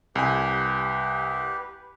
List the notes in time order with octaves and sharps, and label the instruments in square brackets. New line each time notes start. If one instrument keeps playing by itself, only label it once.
[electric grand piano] C2 G#5 [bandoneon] G4 B4